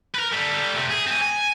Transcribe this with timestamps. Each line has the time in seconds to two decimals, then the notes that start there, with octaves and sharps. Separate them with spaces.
0.15 A#4 B4
0.32 G3 A4
0.75 C3 A3
0.90 G#4
1.06 C4 G#5
1.21 G#5